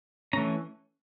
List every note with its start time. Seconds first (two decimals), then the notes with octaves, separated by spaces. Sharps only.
0.33 E3 A3 C#4 A#5